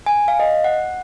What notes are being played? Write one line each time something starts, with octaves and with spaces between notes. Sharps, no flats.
G#5
F5
D#5
F#5